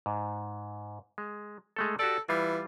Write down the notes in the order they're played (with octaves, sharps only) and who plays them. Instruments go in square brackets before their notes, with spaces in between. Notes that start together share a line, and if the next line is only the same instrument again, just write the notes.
[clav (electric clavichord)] G#2
G#3
G#3 A3 A4
[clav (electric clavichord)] F#4 G4 D5 [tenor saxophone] A4
[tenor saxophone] E3 [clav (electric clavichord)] G3 F4